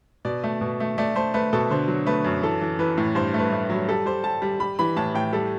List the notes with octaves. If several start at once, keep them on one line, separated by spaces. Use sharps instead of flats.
B2 D5
A3
B2
A3
A3 D5
A3 C5
A3 B4
B2 A4
D3 C5
F#3
A3 B4
F#2
E3 A4
E3
E3 B4
A2
G2 C5
A3 B4
A3
F#3
G3 A4
G3 C5
G3 A5
G3
G3 B5
E3 B5
A2 A5
A2 G5
G3 A4